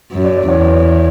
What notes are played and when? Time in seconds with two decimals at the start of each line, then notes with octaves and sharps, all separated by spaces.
0.13 F#2
0.24 D5
0.37 D5
0.48 E2 C#5